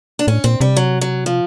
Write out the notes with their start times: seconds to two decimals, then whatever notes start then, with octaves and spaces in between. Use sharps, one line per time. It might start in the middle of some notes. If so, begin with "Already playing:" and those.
0.19 D4
0.27 A2 C#4
0.44 A#2 C4
0.61 C3 G3
0.76 F#3
1.01 F#3
1.26 F3